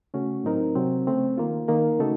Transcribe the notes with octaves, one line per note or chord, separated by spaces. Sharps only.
C#3 A3 C#4 F#4
A2 F#3 C4 D#4 A#4
C3 F#3 C4
C#3 A3 C4
D#3 A#3 F4
D#3 A#3 D#4 A#4
C#3 A3 D#4 F#4 A4